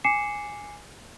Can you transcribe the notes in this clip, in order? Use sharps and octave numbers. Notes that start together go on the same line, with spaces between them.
G#5 D6 C7 C#7 E7